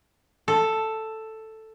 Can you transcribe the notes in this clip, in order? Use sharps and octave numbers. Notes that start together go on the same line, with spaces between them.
A4